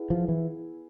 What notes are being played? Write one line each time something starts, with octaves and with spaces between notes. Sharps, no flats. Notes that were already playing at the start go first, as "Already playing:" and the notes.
Already playing: B3 E4 G#4
F3
E3